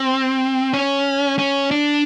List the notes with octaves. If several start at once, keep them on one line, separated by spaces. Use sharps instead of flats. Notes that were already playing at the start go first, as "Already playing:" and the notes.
Already playing: C4
C#4
C#4
D4